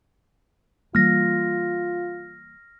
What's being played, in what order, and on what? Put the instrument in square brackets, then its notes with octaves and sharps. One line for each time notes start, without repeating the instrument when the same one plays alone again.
[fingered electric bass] E3 G3 A#3 [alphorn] F4 [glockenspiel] F6 A#6